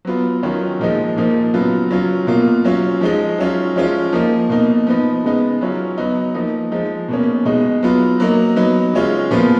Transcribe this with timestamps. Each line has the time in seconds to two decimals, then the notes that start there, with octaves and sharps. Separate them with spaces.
0.05 F#3 B3 F4
0.43 D#3 F#3 C#4 F4
0.79 A#2 F3 G#3 D#4
1.16 A#2 F3 A#3 D#4
1.53 C#3 F#3 B3 F4
1.91 F#3 C#4 F4
2.27 B2 A#3 F4
2.65 F#3 C#4 F4
3.01 F3 G#3 D#4
3.38 F#3 C#4 F4
3.76 F3 G#3 C#4 F4
4.12 F3 A#3 D#4
4.49 B2 A#3 D#4
4.87 F3 B3 D#4
5.24 C#3 G#3 B3 D#4
5.61 C#3 F#3 C#4 F4
5.98 F#3 B3 D#4
6.34 F3 A#3 D#4
6.72 F3 G#3 D#4
7.08 B2 A#3 C#4
7.45 B2 G#3 D#4
7.83 F#3 B3 F4
8.20 F#3 A#3 D#4
8.56 F#3 B3 D#4
8.93 C#3 G#3 C#4 F4
9.31 A#2 F3 B3 F4